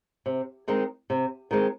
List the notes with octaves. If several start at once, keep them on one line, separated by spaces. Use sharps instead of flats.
C3
D#3 G#3 C4 D#4
C3
D#3 G#3 C4 D#4